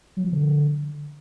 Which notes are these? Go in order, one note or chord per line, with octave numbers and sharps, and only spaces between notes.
F#3
F3
D3